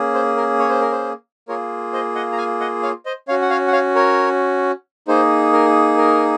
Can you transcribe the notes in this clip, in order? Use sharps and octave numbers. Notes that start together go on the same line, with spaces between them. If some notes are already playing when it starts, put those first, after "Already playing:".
Already playing: A#3 C#4 G#4
C5
A#4
C#5
C5
A#4
C5
A#3 F4 G#4 A#4 C#5
C5 D#5
D#5 F#5
A#5
F5 G#5
D#5 F#5
C#5 F5
C5 D#5
C#4 F#4 C#5 F5
F#5
C#5 F5
F#5
C#5 F5
A#4 C#5
A#3 D#4 G#4 C5
A#4
A#4